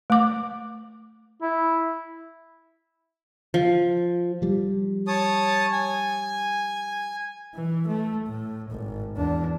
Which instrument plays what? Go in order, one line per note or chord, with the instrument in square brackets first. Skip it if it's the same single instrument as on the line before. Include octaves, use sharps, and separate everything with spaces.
[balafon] A3 D6
[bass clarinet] E4
[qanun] F3
[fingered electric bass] F3 G3
[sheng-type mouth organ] C#5 A5 D#6
G#5
[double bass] E3
A3
A2
G#1
E2 D4